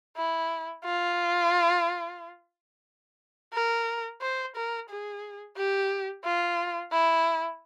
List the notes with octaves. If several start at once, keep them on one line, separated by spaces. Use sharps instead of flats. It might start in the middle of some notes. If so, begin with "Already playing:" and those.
E4
F4
A#4
C5
A#4
G#4
G4
F4
E4